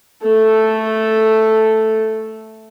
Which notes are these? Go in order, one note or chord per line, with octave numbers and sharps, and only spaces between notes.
A3 A4